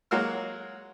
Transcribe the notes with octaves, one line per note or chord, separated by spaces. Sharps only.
F#3 G#3 A#3 F#4 F6